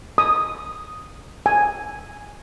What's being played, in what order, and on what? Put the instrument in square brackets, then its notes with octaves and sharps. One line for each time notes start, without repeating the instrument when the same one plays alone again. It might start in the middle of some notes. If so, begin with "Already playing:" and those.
[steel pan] D#6
G#5